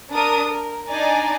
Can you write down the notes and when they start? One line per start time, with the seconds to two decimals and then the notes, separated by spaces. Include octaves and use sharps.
0.12 D4 A#4 D#6
0.48 A#4
0.89 D4 D#4 D5 G#5 A#5